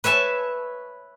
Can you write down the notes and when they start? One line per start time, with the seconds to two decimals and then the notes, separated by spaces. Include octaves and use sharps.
0.04 B4 C#5 E5 G#5 A5